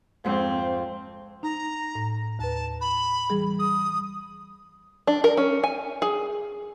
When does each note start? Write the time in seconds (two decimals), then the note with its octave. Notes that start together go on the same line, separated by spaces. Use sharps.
0.25 F2 G#2 C4
1.43 D#4 A#5
1.95 A2
2.39 D#2 B4 A5
2.81 B5
3.30 E3 G3 G#4
3.59 D#6
5.07 D4
5.24 A#4
5.37 C#4
5.64 G#5
6.02 G#4